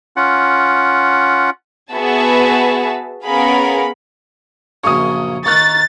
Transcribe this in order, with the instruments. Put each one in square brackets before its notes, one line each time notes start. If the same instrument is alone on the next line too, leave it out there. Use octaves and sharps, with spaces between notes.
[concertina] C#4 F4 F#5
[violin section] B3 F#4 G#4 B4 E5 A5
B3 C#4 G#4 A#4 F5 B5
[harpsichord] A#1 F#2 C#3 [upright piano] C#6 D#6
[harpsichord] D#3 A#3 [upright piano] C#6 F#6 [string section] A6